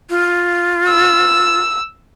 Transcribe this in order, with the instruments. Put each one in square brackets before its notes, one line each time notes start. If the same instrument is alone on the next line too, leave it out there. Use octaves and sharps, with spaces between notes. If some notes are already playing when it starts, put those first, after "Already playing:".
[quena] F4
[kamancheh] E6